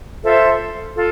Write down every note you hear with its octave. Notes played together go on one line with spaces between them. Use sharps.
F4 A4 C5 E5
F4 A4